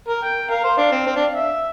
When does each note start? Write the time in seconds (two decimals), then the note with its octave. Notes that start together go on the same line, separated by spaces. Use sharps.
0.08 A#4
0.22 G5
0.50 A#4 F5
0.64 C5
0.78 D4 F5
0.92 C4
1.07 C4
1.16 D4
1.35 E5